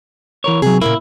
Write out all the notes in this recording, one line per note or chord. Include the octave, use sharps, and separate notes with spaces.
E3 A#4 C#5
C3 F#3 G#4
A#2 C#3 A#3 E4